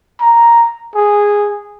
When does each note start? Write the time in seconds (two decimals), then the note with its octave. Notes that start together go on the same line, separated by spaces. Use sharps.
0.20 A#5
0.95 G#4